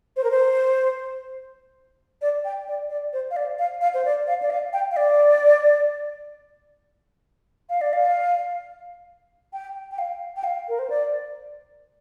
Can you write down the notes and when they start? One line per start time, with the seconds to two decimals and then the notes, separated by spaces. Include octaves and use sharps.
0.16 C5
0.24 A#4
0.31 C5
2.22 D5
2.44 G5
2.68 D5
2.90 D5
3.13 C5
3.31 F5
3.36 D5
3.59 F5
3.81 F5
3.94 C5
4.05 D5
4.27 F5
4.42 D5
4.50 F5
4.73 G5
4.91 F5
4.96 D5
7.69 F5
7.81 D5
7.93 F5
9.53 G5
9.91 G5
9.98 F5
10.36 G5
10.44 F5
10.68 A#4
10.79 C5
10.90 D5